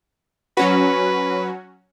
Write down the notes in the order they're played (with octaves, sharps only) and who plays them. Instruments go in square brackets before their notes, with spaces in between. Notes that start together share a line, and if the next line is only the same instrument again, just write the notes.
[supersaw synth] F#3 C#4 F#4 [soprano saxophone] B4